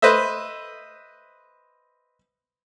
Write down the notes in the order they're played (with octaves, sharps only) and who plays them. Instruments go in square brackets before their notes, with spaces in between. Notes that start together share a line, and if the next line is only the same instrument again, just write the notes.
[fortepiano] B4 C5 D#5 E5